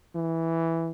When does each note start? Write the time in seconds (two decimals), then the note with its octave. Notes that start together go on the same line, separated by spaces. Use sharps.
0.15 E3